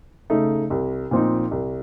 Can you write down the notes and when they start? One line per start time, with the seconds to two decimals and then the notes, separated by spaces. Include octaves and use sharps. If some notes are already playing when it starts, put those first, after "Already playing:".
0.30 C#3 A3 D#4
0.70 C2
1.11 A#2 F3 C4 D#4
1.51 C2